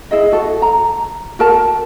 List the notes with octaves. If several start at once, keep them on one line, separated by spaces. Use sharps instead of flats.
E4 G#4 D#5
F#4 A4
A#5
F#4 A#4 A5